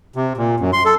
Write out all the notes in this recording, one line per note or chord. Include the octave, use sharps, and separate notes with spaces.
C3
A#2
F#2
C6
A4